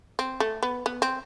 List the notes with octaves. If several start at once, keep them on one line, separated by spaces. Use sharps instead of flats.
C4
A3
B3
B3
C4